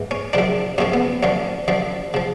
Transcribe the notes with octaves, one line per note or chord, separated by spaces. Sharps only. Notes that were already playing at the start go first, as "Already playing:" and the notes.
Already playing: G#2 E3
C#4
F#2 C#3 F3 D4
F#2 C#3 F3 C#4
B3
F#2 D3 F3 C#4
F#2 D3 F3
C#3 F3